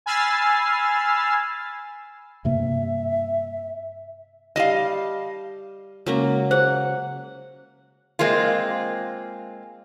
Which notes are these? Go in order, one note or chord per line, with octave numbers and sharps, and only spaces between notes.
G#5 B5 E6 F6 A6 C7
G2 C3 A#3 E5
G3 D#5 F5 A5
C#3 F#3 G#3 A#3 C#4 A#5
G#4 C5 F#5
G#3 A#3 C4 F4